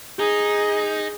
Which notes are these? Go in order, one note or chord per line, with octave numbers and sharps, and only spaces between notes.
D#4 G#4